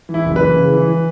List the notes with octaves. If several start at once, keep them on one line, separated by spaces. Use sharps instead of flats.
E3
E4
F#1
E3 B4
C#3
E3
E3